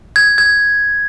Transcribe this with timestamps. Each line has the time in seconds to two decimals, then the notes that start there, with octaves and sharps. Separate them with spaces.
0.16 G#6
0.38 G#6